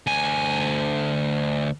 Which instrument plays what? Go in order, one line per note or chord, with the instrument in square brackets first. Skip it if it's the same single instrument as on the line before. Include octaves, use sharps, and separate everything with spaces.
[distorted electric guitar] D2 G#5